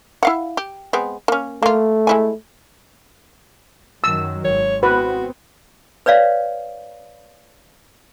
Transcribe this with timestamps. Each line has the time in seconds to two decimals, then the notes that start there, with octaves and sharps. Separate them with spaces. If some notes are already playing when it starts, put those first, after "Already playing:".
0.23 E4 F5 F#5
0.57 G4
0.93 G#3 B3 C4
1.28 A#3 C#4
1.63 A3 A#3 F4
2.07 G#3 E4 G#5
4.04 F#2 D#3 F#3 E6
4.45 G#1 C#5
4.83 B3 C4 F#4 B4
6.06 B4 C#5 D5 F5